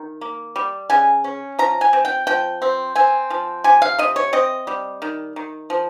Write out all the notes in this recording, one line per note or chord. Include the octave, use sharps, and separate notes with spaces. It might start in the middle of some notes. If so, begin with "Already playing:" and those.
Already playing: D#3
A#3
G3
C#3 G#5
C#4
F3 A#5
G#5
C4
G5
F3 G5
C4
C4 G#5
F3
C3 G#5
F5
C3 D#5
C#5
C4 D#5
G3
D#3
D#3
F3